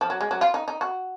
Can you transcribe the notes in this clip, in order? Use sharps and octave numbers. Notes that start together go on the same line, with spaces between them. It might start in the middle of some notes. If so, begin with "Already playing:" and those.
F3
F#3
G#3
F#3
F4
D#4
D#4
F#4